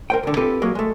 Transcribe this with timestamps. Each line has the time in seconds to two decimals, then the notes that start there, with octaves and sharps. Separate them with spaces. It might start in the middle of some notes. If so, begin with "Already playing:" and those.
0.10 A#4 C5 G5
0.23 C2 D3
0.37 C4 F4 G4 A4 B4
0.62 F#3 G#3 A#3
0.75 G#3 A3